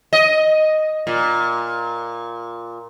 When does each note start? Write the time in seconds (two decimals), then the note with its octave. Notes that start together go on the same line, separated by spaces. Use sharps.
0.13 D#5
1.07 A#2